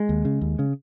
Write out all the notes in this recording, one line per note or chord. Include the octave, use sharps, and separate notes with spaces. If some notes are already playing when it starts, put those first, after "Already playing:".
Already playing: G#3
D#2
C#3
D#2
C#3